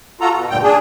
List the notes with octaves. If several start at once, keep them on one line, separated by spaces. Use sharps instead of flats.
F4 F#4 A4 A#5
B2
D2 G2 A#2 G5
D4 G#4